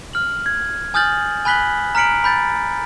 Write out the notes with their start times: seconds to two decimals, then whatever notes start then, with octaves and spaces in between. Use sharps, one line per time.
0.13 F6 F#7
0.46 G#6
0.94 G#5 D#6 F6 G6 A6 F#7
1.45 G#5 B5 F#6 B6 F#7 G7
1.95 A#5 F6 B6 C#7 D7 F#7
2.24 B5 G6 A6